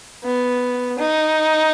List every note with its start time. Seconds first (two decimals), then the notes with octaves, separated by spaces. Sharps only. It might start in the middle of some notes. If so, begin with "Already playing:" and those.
0.24 B3
0.98 D#4